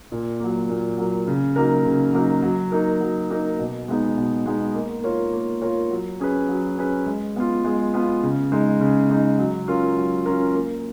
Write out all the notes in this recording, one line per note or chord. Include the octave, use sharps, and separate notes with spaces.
A#2
F#3 A#3
A#2
F#3 A#3
C#3
F#3 A#3 D#4 A#4
C#3
F#3 A#3 D#4 A#4
F#3
A#3 D#4 A#4
F#3
A#3 D#4 A#4
B2
G#3 B3 D#4
B2
G#3 B3 D#4
A#3
F4 A#4 C#5
A#3
F4 A#4 C#5
F#3
C#4 G#4 B4
F#3
C#4 G#4 B4
G#3
B3 F4
G#3
B3 F4
C#3
G#3 D#4
C#3
G#3 D#4
F#3
C#4 F4 A#4
F#3
C#4 F4 A#4
A#3